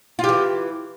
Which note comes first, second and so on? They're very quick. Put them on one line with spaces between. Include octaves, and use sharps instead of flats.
F4 G4 E3